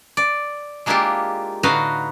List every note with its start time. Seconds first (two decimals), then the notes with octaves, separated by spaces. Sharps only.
0.17 D5
0.86 G#3 A#3 D4 E4 F4 G4
1.63 A2 D3 D#4 F#4 B4 F5